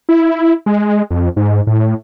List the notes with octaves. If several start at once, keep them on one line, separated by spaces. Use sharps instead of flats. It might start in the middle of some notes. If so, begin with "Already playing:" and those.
E4
G#3
F2
G#2
A2